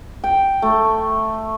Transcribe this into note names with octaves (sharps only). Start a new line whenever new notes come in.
G5
A3